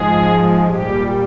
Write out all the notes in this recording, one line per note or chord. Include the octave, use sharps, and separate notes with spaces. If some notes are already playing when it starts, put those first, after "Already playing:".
Already playing: G#2 F3 G#3 G#4
A#2 G3 G4